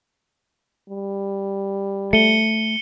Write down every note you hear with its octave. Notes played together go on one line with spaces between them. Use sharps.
G3
A3 C#7 D#7 G7